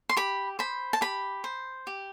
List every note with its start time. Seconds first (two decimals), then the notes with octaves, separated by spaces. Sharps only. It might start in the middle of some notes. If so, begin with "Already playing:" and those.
0.09 C6
0.17 G4 B5
0.59 C5 B5
0.93 A5
1.01 G4 B5
1.44 C5
1.87 G4